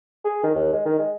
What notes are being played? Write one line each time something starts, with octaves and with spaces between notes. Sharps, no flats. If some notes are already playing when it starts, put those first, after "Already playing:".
G#4
D#3
D#2
G#3
D#3
G#3